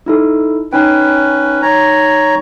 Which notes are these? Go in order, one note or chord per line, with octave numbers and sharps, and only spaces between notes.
D#4 E4 A4
C#4 D#4 B4 G5
C#5 A#5